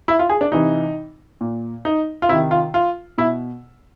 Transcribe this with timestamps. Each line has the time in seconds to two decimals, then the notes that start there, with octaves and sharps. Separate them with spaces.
0.08 E4
0.19 F4
0.30 G#4
0.41 D4
0.52 C3 E3 D#4
1.41 A#2
1.85 D#4
2.22 F4
2.29 C3 E4
2.32 D#3
2.51 F4
2.74 F4
3.18 B2 E4